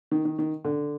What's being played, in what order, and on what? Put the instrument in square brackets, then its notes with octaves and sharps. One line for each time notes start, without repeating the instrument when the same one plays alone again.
[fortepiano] D#3
D#3
D#3
D3